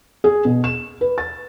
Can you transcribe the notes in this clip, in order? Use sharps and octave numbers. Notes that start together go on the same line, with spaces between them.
G#4
B2
E7
B4
A6